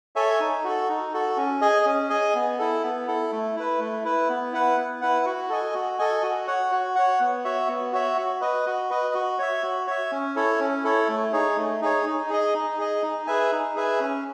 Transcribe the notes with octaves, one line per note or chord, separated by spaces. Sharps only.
A4 C#5 E5 G#5
D#4
F#4 A4
D#4
F#4 A4
C#4
G#4 D#5 G#5
C#4
G#4 D#5 G#5
B3
E4 A4
B3
E4 A4
A3
E4 B4
A3
E4 B4
B3
E4 B4 F#5
B3
E4 B4 F#5
F#4
A4 D#5 G#5
F#4
A4 D#5 G#5
F#4
C#5 F#5
F#4
C#5 F#5
B3
F#4 C#5 E5
B3
F#4 C#5 E5
F#4
B4 D#5
F#4
B4 D#5
F#4
C#5 E5
F#4
C#5 E5
C#4
E4 A4 C#5
C#4
E4 A4 C#5
A3
D#4 G#4 C#5
A3
D#4 G#4 C#5
D#4
G#4 D#5
D#4
G#4 D#5
D#4
G#4 B4 E5 G#5
D#4
G#4 B4 E5 G#5
C#4